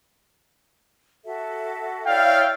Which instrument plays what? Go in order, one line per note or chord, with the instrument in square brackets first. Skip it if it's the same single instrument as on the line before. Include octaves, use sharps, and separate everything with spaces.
[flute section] F#4 A4 E5
[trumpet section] E4 F5 [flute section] C#5 D5 E5 [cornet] G5